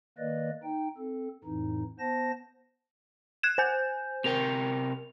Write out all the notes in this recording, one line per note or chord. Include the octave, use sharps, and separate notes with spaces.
D#3 A#3 B4 D5 D#5
D#4 G5
C4 A4
F2 A2 E3 D#4
B3 C5 A5 A#6
F#6 G#6 E7
C5 G#5 G6
C3 A#4 G5 F7